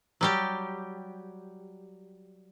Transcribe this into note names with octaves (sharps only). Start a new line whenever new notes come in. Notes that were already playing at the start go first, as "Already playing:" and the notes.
F#3 G3 G4